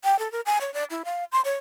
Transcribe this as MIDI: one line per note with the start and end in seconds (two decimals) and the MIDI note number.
0.04 0.19 79
0.19 0.31 69
0.32 0.41 70
0.46 0.58 80
0.61 0.73 73
0.74 0.84 74
0.90 1.03 64
1.05 1.24 77
1.32 1.41 84
1.45 1.55 73